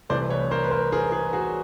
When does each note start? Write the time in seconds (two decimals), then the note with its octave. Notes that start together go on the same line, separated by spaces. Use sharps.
0.09 C2 C3 E3 A3 C5 D5
0.30 B4 C#5
0.51 A#4 C5
0.64 B4
0.71 A#4 C5
0.92 G#4 A#4
1.12 G#4 A#4
1.33 F#4 G#4